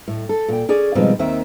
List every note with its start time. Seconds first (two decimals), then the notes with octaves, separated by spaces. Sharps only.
0.08 A2
0.29 A4
0.48 A#2 G5
0.69 C#4 G#4 D5
0.95 B2 D#3 F3 G3 G#3 C4
1.19 D#2 D#3 C4 E5